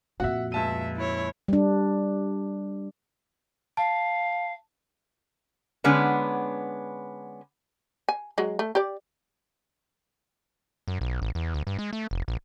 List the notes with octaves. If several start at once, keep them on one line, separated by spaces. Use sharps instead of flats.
F2 A#2 F#4 E5 F#5
C#2 E5 A5 D#7
E4 C#5
G3 D4
F5 A5
D3 G#3 B3 C#4 D4
G#5
F#3 G#3
A3
G4 D5
F#2
B1
A1
E2
D2
G2
G#3
A3
F1
A#1